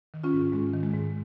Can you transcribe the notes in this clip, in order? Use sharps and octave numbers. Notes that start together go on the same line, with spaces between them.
D#3
C#4 F4
G#2
G#2 G#3
D#3
G#3
G#2